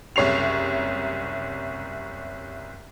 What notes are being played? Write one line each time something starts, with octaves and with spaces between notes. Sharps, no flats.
F#1 C2 C#5 C7 F7